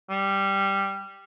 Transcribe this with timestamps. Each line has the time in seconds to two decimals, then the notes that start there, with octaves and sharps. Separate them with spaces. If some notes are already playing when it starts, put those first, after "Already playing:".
0.10 G3